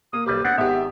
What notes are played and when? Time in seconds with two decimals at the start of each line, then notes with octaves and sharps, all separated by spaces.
0.13 A#3 D#6
0.26 B1 G3 G4 B4
0.45 B3 C4 D4 F#5
0.58 G#1 G#2 B3 G4 E5